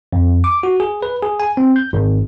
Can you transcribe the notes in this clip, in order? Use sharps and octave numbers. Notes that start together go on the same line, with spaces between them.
F2
D6
F#4
G#4
B4
G#4
G#5
C4
G6
G#1